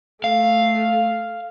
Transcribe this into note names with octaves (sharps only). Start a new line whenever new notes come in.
A3 F5